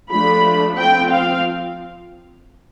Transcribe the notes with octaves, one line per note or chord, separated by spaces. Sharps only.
F3 A3 D4 B5
F3 C4 G5
F5